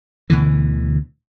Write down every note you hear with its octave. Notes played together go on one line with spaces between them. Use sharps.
D2 B2 D3 E3